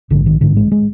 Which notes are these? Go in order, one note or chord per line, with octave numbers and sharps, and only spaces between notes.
A#1 G#2 D3
D#3
A1 G#2 D3
G#3
G#3